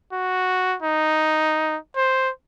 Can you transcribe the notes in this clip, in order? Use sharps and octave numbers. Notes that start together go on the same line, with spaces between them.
F#4
D#4
C5